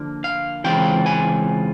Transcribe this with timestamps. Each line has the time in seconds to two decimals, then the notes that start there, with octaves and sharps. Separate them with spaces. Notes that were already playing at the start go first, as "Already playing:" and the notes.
Already playing: D3 F3 A#3
0.24 F5
0.64 C#3 E3 G#3 C4 F4 G5
1.06 G#5